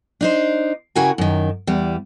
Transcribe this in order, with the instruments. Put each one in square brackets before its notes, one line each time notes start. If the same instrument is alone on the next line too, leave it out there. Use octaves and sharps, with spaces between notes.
[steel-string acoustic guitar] D4 D#4 C5
C#3 E4 F#4 G4 A#4 G#5
F#2 D#3
E2 G3